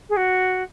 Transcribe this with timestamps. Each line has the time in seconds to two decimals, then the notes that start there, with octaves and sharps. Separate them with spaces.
0.09 G#4
0.16 F#4